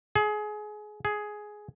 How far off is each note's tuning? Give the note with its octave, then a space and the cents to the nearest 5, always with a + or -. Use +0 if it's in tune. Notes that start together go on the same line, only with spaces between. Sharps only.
G#4 +25
G#4 +10